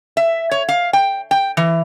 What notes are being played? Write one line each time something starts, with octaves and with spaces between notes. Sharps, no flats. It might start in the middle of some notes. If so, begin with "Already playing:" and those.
E5
C#5
F5
G5
G5
E3